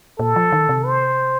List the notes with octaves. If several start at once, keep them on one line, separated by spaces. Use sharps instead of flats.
A#2 A4
F3
D#3
C3
C5